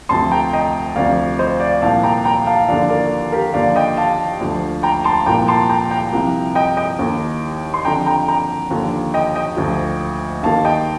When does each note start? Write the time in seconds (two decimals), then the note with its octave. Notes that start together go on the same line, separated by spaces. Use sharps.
0.09 D2 C3 F3 A5 C6
0.31 G5 A#5
0.53 D#5 G5
0.96 D2 C3 F3 D5 F5
1.39 C5 D#5
1.60 D5 F5
1.82 C2 A#2 F3 F5 A5
2.03 G5 A#5
2.25 G5 A#5
2.46 F5 A5
2.68 D#2 D3 F3 D5 F5
2.90 A#4 D5
3.32 G4 A#4
3.54 D#2 D3 F3 D5 F5
3.75 D#5 G5
3.97 F5 A5
4.40 D2 D3 F3
4.83 G5 A#5
5.04 A5 C6
5.26 C2 A#2 F3 G5 A#5
5.48 A5 C6
5.69 G5 A#5
5.91 G5 A#5
6.12 C2 C3 F3
6.55 D#5 G5
6.77 D#5 G5
6.99 D#2 D#3
7.74 C6
7.85 F2 D3 F3 G5 A#5
8.06 G5 A#5
8.28 G5 A#5
8.70 D#2 D3 F3
9.14 D#5 G5
9.35 D#5 G5
9.57 D2 D3 F3
10.43 D#2 D#3 F5 A5
10.64 D#5 G5